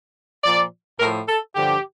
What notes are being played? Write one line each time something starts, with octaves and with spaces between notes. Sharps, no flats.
A#2 F3 D5
A2 F3 A#4
A4
G2 D3 F3 G4